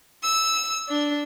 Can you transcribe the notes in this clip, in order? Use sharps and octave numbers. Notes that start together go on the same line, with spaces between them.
E6
D4